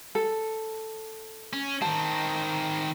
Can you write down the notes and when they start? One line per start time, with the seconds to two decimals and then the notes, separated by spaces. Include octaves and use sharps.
0.15 A4
1.53 C#4
1.82 D#3 C4 A5